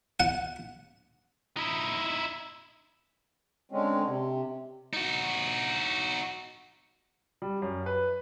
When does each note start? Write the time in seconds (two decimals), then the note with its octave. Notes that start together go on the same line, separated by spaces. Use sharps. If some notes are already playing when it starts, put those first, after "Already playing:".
0.20 F#5
1.57 D#4 E4
3.72 D3 G#3 C4 C#4
4.06 C3
4.93 D#4 F#4
7.42 G3
7.62 F#2
7.86 B4